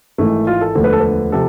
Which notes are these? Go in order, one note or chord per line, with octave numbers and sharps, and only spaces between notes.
G#1 G#2 E3 A3
F4
A4
E1 D2 D3 F3
B4
A4
B4
C3 F3 A4